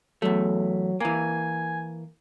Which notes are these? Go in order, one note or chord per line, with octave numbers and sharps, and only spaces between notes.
E2 F#3 A3
E3 A#3 G#5